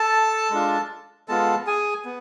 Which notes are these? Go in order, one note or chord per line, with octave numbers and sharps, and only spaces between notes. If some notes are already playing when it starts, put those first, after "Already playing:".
Already playing: A4 A5
G#3 D4 F4
G#3 B3 F4 A4 A5
G#4 G#5
B3